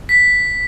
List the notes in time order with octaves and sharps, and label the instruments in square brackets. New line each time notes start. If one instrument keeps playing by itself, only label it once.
[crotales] B6